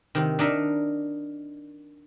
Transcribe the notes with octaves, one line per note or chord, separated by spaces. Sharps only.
C3 D#3
D4 D#4 A#4 E5